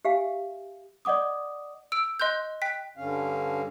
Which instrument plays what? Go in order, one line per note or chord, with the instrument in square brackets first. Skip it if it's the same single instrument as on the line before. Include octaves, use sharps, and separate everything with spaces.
[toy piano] G4 E5 F5 G#5
[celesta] D5 D#5 F#5 D6 D#6
[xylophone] E6 D7
D#5 C6 F#6 G6
G5 F#6 B6
[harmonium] G2 D3 C#4 F5